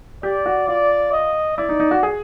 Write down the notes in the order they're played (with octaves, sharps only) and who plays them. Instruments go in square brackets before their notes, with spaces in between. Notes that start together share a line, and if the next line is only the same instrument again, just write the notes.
[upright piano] G4 [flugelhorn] D5
[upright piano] F#4
[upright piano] F4 [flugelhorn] D5
[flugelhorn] D#5
[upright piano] E4 [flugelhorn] D5
[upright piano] D#4
D#4
F#4
G#4